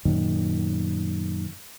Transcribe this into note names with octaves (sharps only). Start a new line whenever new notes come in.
F#2 A#2 D#3